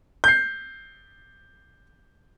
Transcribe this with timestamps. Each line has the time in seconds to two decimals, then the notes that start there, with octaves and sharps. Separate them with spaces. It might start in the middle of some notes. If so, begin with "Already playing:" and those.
0.24 G6 C7